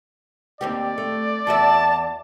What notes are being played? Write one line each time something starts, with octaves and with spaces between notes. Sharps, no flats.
D#2 C4 G4 D5
A3
E2 F#4 E5 A5